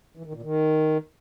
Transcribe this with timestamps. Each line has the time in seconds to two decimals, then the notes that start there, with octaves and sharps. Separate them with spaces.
0.17 E3
0.26 D#3
0.34 A#2
0.42 D#3